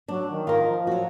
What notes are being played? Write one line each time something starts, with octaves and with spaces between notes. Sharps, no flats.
F#3 D4
D#3
F4 A#4
F3
F#3 F#4